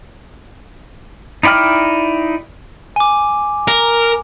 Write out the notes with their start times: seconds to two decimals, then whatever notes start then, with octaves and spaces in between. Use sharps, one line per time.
1.43 D#4 E4 D5 G5 F6
2.96 G#5 D6
3.68 A#4